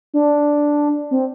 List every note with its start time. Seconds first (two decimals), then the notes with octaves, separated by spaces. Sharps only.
0.14 D4
1.11 C4